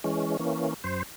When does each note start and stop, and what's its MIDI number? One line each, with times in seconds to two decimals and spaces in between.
0.04 0.37 52
0.04 0.37 56
0.04 0.37 61
0.39 0.74 52
0.39 0.74 58
0.39 0.74 61
0.84 1.03 42
0.84 1.03 72